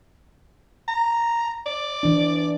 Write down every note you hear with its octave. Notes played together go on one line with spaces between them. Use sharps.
A#5
D5
E3 D4